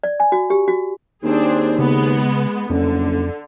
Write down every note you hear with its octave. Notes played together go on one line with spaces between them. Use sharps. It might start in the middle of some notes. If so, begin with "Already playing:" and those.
D5
G#5
F#4
G4
F#4
D#2 C4 D4 G#4
C#3 G#3 B3
F#1 F2 D3